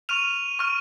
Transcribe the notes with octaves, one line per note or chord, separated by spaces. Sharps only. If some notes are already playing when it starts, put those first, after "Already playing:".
C#6 F6 D#7 F7
C#6 F6